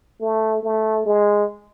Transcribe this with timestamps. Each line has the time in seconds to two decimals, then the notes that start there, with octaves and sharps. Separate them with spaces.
0.21 A3
0.63 A3
1.06 G#3